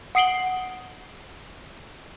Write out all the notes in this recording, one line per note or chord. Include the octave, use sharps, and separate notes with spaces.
F#5 D#6 C7 D7 F#7 G7